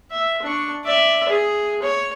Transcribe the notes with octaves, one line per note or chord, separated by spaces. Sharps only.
E5
D4 C#6
D5 E5
G#4
C#5